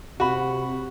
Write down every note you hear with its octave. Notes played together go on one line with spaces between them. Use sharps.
C3 F#4 B5